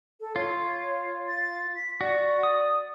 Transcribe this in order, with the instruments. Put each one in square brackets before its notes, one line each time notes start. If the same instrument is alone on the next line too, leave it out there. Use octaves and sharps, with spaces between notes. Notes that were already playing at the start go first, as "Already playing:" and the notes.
[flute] A4
[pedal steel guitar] F4 [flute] C#5
[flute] A6
B6
[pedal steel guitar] F#4 [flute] D5
[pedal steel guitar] D#6